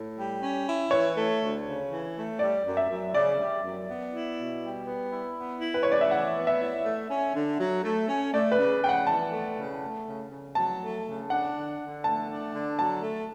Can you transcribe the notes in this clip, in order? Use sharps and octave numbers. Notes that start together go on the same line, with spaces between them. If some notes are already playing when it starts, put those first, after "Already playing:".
Already playing: A2
G3
C#4
E4
E3 C#5
A3
D2
C#3
E3
A3
G3 D5
F#2
E5
F#2
C#3 D5
G3
F#2
B3
E4
B2
G3
B3
E4
B3
E4
B4
C#3 C#5
D5
E5
E3 F#5
B3
E5
E4
A3
C#4
D3
F#3
A3
C#4
A3 D5
B4
C#3
C#3 G5
F#5
E3 A5
A3
C#3
A3
C#3
C#3
F#3 A5
A3
C#3
D4 F#5
D3
D3
A3 A5
D4
D3
F#3 A5
A3